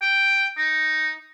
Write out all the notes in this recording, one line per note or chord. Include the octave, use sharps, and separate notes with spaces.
G5
D#4